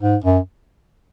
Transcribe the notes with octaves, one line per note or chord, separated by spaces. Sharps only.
G#2
F#2